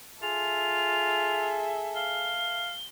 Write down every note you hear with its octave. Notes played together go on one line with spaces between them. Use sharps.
F4 G#4 A4 E5 F7
F5 G7